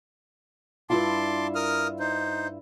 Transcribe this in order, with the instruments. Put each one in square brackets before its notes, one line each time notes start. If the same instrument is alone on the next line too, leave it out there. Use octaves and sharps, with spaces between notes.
[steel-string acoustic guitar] G2 E4 F4 [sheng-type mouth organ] A5 C6 D6
[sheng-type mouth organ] A#4 D#6 F6
D#4 C5